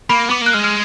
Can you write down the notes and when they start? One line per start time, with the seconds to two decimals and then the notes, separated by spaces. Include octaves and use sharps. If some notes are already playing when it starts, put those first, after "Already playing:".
0.10 A#3 B5
0.30 B3 D6
0.41 A#3 F#6
0.53 G#3 F6
0.64 F6